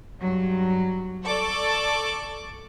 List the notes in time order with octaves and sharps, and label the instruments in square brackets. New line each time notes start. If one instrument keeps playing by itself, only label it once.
[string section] G2 F#3
A4 D5 A5 C#6 D6